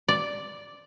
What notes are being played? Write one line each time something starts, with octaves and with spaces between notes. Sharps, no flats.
D5